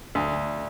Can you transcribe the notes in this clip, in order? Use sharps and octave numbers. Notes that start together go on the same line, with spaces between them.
D2